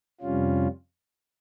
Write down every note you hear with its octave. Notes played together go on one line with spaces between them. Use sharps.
F2 C3 G3 C#4 F4